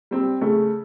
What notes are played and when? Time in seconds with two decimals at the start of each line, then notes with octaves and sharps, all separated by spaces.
0.11 G3 C4
0.41 C#3 A3